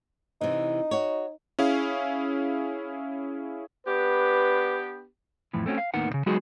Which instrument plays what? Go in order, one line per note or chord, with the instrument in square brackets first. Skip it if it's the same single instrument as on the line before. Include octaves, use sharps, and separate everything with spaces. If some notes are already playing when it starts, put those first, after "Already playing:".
[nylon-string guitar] C3 E3 [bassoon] D#4
[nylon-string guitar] F#4 C#5
[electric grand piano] C#4 E4 G#4 F5
[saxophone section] B3 D4 G4 [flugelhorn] B4
[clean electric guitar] F2 A2 E3
A3 C4 C#4 F#4
F5
D#2 A2 A#3 B3 D#4 F#5
D#2 C#3
F#3 G#3 B3 D#4 F#4 G#4